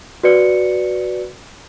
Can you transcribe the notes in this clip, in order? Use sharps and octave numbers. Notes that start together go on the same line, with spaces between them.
F#4 B4 D5 C#7